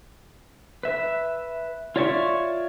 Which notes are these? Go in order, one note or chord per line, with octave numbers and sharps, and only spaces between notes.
B4 E5
F4 C#5 D5 E5 C#6